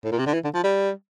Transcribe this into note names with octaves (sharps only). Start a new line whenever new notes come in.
A2
A#2
C3
D3
E3
D3
F3
G3